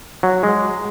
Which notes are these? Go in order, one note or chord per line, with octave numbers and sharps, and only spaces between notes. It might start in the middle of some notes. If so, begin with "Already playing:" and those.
F#3
G#3